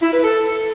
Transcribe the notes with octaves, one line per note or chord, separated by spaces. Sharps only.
E4
B4
A4